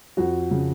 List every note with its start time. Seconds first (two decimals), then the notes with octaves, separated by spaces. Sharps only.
0.17 F2 F#4
0.51 C#3